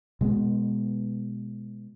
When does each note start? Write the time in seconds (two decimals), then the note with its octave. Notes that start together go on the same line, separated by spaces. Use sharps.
0.21 B2 G#3 A#3 B3